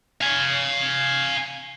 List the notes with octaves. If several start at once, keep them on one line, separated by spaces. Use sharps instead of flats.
F5 G#5